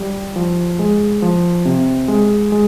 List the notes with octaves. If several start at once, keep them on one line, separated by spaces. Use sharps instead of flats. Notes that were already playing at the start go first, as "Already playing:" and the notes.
Already playing: G3
F3
G#3
F3
C3
G#3
G#3